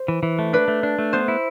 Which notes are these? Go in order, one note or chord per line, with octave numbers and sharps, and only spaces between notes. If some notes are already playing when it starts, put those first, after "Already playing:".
Already playing: C5
E3
E3
A3
D4 B4
A3
D4
A3
B3 C5
E4